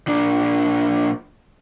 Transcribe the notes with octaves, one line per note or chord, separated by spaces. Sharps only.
A#2 D4